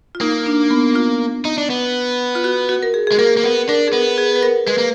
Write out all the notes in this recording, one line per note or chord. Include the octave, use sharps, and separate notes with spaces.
F4
A#3 D#4
D4
B3
F4
D#4
D4
B3
F4
F#4
F#4
A#4
G#4
G#3 G#4
A#3 A#4
A#3
B3 A#4
D4 A#4
G#4
B3 A#4
G#4
B4
A#4
G#3 B4
A#3